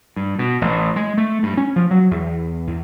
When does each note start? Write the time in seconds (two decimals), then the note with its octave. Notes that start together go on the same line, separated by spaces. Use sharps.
0.16 G2
0.39 B2
0.61 A1
0.96 G#3
1.18 A3
1.43 G2
1.57 C#4
1.76 F3
1.91 F#3
2.11 E2
2.67 E2